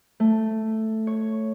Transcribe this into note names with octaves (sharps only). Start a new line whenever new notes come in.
A3
C#5